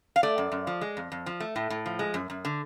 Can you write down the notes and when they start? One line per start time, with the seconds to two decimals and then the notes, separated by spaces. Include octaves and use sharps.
0.16 F5
0.23 A3 D5
0.38 F#2
0.52 F#2
0.67 F3
0.81 G#3
0.97 F2
1.12 F2
1.26 F3
1.40 A3
1.56 A2
1.70 A2
1.86 F3
1.99 G#3
2.14 F#2
2.30 F#2
2.45 D3